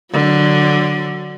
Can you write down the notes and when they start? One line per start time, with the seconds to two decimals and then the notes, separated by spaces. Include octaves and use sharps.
0.13 D3 F#3